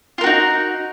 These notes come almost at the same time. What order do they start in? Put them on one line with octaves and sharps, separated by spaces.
F4 A#4 F#4 D#4